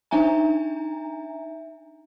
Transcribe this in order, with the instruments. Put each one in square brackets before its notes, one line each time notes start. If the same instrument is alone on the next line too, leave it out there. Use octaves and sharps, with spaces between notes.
[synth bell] D4 D#4 E5 G#5 A#5